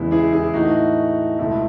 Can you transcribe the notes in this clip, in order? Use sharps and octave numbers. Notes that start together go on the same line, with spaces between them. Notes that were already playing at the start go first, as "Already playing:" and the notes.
Already playing: E2 C#3 G#3 B3 E4
E4 G#4
E4 G#4
A2 E3 A3 D#4 F#4
C#2 B2 A3 E4